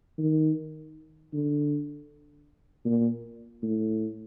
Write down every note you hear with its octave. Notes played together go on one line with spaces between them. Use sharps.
D#3
D3
A#2
A2